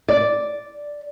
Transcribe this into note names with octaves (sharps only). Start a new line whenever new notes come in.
D5